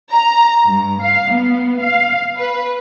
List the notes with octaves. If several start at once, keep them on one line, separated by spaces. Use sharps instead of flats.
A#5
G2
F5
B3
F5
B4